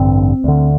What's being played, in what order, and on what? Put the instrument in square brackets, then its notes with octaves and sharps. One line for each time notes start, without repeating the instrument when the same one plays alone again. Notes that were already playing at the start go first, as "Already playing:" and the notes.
Already playing: [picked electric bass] A1 G2 D3 C4
D2 D3